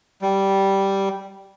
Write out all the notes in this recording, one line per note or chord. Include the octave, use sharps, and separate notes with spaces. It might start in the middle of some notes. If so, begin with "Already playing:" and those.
G3